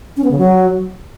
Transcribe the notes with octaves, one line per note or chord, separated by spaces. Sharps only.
C#4
B3
C#3
F#3